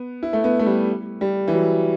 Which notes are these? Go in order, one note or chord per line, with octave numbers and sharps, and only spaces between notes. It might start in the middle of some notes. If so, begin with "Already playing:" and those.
Already playing: B3
E4
A3
B3
A3
G3
G3
E3
F#3